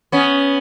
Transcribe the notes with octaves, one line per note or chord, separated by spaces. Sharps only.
B3 C#4